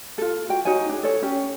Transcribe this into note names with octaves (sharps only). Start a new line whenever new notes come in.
F4 A4
F#4 G5
D#4 F#4 C#5 G#5
D4 G#4
A4 C#5
C#4 G4